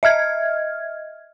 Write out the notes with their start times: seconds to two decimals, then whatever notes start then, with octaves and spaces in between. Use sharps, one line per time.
0.03 D#5 E5 F6 G#6